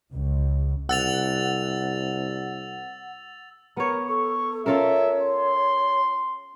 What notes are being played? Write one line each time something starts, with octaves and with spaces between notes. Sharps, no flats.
C#2
C2 F#5 E6 A6 F7
B3 A#4 C#5
A4 C#6
C#4 F4 A4 A#4 C#5 E5
C6